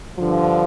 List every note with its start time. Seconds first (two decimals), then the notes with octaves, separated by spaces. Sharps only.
0.18 G2 D3 F3